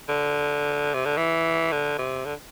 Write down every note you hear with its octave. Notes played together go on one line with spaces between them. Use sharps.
D3
C3
D3
E3
D3
C3
D3